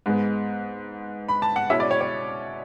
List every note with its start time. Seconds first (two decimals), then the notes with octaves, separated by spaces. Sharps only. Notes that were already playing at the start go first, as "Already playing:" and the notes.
0.06 G#2 G#3 B3
1.29 B5
1.42 A5
1.56 F#5
1.70 B2 G#3 C#4 E4 E5
1.80 D5
1.91 C#5
2.01 C#5